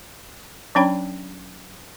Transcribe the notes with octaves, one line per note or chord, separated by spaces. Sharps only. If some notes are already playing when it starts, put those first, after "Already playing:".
F#3 C#4 D4 C#5 G5 B5